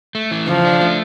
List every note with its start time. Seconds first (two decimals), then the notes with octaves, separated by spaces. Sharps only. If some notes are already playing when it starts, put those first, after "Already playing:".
0.15 A3
0.31 E3
0.47 C#3 F3
0.65 D4
0.82 A3